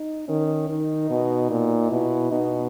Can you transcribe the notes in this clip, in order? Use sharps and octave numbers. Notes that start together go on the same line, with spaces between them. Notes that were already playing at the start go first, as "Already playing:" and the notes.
Already playing: D#4
D#3 C#4
D#3 D#4
B2
A#2
B2 E4
B2 D#4